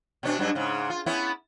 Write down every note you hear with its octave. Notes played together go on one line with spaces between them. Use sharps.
B2 C#4 D4
G2 F#3 D4
G#2 C#3
F4
B3 C#4 E4